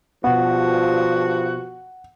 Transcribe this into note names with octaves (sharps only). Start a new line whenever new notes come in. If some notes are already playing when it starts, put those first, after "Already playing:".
G2 B2 F3 B3 F#4 F#5